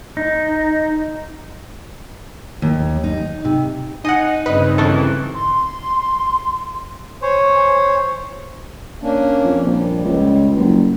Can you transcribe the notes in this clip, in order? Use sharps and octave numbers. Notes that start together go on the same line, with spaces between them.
D#4
D#2
D#4
C3
D#4 D#5 F#5 G#5
G2 C#3 C4 B4 D#5
D#3 E3 A4
C6
C5 C#5 G#5
A#3 C#4 D4
F2
A#1 G3
C#2
F#1